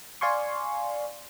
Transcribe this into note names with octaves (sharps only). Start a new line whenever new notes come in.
D5 F5 G#5 C6 C#6